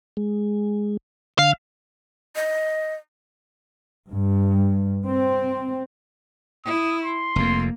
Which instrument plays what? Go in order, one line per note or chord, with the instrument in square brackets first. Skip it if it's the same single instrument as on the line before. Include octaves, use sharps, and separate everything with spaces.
[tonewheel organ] G#3
[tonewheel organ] D3 F6 [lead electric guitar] F5
[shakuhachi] D#5
[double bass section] G2
C4
[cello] E4 [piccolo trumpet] D#6
[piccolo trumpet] C6
[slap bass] F1 F2 [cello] A#3